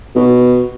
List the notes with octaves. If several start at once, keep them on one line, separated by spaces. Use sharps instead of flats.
B2